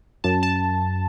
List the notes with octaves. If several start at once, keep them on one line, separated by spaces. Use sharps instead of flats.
F#2 A5
A5